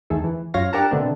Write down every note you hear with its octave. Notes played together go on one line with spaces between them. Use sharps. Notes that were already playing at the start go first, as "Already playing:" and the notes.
E2 D#3 A3 G#4 A4
E3
F#2 F4 C#5 F5 A#6
D4 G4 A#4 F#5 A5 A#5
B2 D3 A3 B3 C4 D4